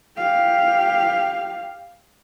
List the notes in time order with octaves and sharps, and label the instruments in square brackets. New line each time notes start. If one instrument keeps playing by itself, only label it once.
[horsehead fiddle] G4 F5